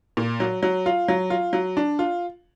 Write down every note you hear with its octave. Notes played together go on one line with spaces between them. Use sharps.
A#2
F#3
F#3
F4
F#3
F4
F#3
D4
F4